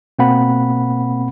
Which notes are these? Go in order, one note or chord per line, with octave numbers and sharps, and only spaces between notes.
B2 A#3 C4 F#5 B5